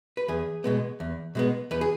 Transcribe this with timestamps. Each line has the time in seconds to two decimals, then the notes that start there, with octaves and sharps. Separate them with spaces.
0.17 B4
0.28 E2 G#4
0.64 B2 G#3 B3
1.00 E2
1.35 B2 G#3 B3
1.71 E2 B4
1.81 G#4